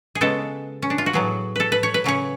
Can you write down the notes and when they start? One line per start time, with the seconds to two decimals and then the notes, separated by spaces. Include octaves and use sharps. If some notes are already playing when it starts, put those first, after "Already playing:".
0.15 G#4
0.21 C#3 G#3 B3 A4
0.82 C#4
0.90 D4
0.98 F4
1.06 F#4
1.13 A2 F#3 B3 G#4
1.56 A4 B4
1.72 B4
1.83 C#5
1.94 B4
2.04 C#3 F#3 C#4 C#5